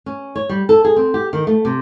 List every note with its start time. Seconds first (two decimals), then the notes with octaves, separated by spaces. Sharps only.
0.06 C#4
0.36 C#5
0.49 G3
0.69 A4
0.84 G#4
0.96 C4
1.14 G4
1.33 D#3
1.47 A3
1.65 C3